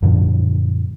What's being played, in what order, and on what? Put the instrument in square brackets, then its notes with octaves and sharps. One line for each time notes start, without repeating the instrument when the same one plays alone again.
[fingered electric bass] F#2 A#2 D3 F3